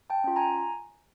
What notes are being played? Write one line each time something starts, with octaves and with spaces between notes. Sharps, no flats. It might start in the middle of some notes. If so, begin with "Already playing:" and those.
G5 A5
C#4 F4
G#5 A#5